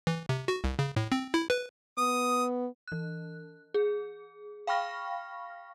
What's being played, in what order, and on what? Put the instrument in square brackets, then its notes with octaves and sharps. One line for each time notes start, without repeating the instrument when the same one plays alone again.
[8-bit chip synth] E3
C3
F#4
C2
C#3
A2
C4
E4
B4
[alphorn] B3 [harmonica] D#6
[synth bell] E3 F#6
G#4
F5 G5 B5 C#6 F6 A#6